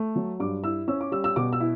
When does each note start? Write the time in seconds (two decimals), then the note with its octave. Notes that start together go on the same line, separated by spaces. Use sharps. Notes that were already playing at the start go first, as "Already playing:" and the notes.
Already playing: A3
0.16 F#3
0.40 G2 D6
0.64 E4 E6
0.88 C#4 E6
1.01 D6
1.12 G3 E6
1.24 E6
1.36 B2 D6
1.53 E6
1.60 E4